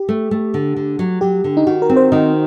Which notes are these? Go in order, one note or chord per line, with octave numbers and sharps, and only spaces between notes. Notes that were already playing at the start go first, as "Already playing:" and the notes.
Already playing: G4
A3
A3
D3
D3
F#3
F#3 G4
D3
D#4
D#3 F#4
A#4
C4
C5
D#3 D#5